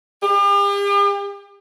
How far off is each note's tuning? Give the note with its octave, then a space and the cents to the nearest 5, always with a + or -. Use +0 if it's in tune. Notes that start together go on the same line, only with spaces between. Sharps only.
G4 +45